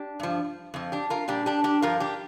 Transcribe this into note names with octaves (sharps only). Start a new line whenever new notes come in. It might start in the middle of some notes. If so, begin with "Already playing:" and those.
Already playing: D4 G4
G2 F3
F2 F3
D4 G4
F4 A#4
A#2 G3 D4 G4
D4 G4
D4 G4
G2 F3 F4 A#4
D4 G4